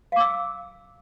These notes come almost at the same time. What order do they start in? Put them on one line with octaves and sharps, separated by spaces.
F5 D6 E6